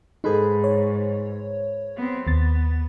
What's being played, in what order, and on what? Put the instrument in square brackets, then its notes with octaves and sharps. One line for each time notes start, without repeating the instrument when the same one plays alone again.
[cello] G#2 [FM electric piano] D#4 A4 [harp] G#4 B4 C5
[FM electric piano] C#5
[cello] B3 C4
[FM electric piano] D#2 A6 [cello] B3